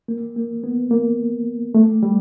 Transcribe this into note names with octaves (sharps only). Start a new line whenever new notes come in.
A#3
A#3
B3
A#3
A3
G3